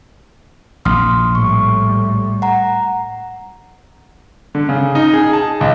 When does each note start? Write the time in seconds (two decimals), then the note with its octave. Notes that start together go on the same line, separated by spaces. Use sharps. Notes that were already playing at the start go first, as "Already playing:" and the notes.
0.85 A#1 C6 D#6 F6
1.35 A2 G3 C#6
2.42 F#5 A#5
4.55 D3
4.69 C#3
4.95 D#4
5.13 G#4
5.33 A5
5.61 C#2